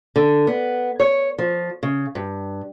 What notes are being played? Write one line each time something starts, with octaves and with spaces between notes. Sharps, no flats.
D3
B3
C#5
F3
C#3
G2